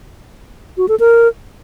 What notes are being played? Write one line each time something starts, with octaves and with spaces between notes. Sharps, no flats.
F#4
A4
A#4